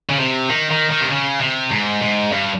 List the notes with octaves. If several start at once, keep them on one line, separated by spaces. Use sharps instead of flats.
C#3
C3
D#3
D#3
D#3
C3
C#3
C3
G#2
G#2
G2